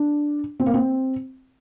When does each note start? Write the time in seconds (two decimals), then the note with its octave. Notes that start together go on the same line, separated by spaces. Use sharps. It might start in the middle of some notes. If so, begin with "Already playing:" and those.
Already playing: D4
0.60 C4
0.66 A#3
0.74 C4